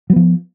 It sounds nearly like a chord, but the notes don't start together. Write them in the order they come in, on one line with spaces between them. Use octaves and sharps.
F#3 B3 F3